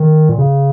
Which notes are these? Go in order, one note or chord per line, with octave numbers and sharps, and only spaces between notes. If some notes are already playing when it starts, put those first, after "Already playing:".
Already playing: D#3
A#2
C#3